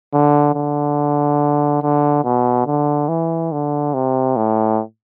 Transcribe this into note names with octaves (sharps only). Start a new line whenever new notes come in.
D3
D3
D3
B2
D3
E3
D3
C3
A2